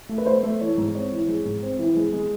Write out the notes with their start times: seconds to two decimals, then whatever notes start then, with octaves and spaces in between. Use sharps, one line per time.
0.09 A3
0.18 B4
0.26 A3 C5
0.43 A3
0.61 E3 C#5
0.77 G#2
0.95 C4 C#5
1.12 E3
1.28 G#3
1.45 G#2
1.62 C4
1.79 E3
1.96 G#3
2.13 G#3